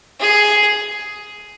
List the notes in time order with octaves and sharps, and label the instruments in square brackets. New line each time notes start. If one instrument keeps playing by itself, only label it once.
[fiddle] G#4